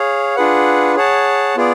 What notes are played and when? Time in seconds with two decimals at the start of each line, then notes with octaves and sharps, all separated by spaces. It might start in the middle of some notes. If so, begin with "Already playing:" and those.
Already playing: G#4 C#5 F5
0.36 D4 F4 G#4 B4 F#5
0.96 G#4 C#5 F#5 A5
1.56 B3 F4 G#4 D5